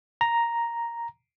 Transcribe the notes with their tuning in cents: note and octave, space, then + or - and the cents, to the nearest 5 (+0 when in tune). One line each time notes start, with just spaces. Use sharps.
A#5 +0